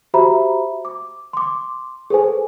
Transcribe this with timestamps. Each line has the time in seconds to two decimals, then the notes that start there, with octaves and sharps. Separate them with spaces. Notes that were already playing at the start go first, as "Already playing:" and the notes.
0.14 F#4 G4 C5 E5 A#5 B5
0.85 D6
1.33 C6 D6
2.10 G#4 A4 B4 C5 G#5